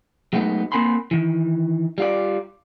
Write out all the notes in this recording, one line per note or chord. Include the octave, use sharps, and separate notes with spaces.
F#3 G#3 A3 B3 D#4
A#3 C4 A#4 G#5 B5 C6
D#3 E3
G3 F4 D5